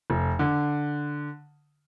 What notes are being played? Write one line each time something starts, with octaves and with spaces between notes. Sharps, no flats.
F1
D3